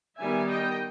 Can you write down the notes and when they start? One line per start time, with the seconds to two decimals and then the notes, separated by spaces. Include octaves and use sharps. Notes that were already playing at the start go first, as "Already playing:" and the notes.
0.18 D#3 G3 B3 E5 G#5
0.49 D#5 G5